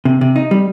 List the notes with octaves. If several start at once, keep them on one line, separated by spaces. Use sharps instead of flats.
C3
C3
D#4
G3